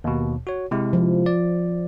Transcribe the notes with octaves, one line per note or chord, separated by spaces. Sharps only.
D#2 B2
F#4 C#5
C3 G#3 E4
F3
D5